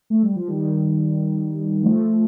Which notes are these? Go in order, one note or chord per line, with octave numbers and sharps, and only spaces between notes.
A3
G3
F3
D#3 G3
F3 A3